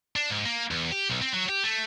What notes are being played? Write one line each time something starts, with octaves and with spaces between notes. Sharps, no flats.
D4
G#2
A#3
E2
G4
B1
C4
F#3
G4
A3